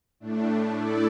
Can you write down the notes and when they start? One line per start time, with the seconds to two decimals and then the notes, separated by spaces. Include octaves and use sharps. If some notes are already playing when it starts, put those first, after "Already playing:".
0.20 A2 A3 D4
0.76 A3 E4 A4 D5